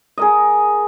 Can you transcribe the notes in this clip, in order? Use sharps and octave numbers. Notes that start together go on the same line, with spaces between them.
G#4 A#4 D#5